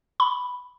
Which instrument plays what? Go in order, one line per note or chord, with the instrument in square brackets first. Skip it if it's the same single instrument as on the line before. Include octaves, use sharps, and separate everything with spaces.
[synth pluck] B5